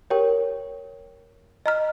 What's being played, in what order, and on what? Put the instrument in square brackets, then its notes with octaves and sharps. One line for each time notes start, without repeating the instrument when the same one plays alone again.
[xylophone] G4 A#4 C#5 G5
D#5 A#5 F6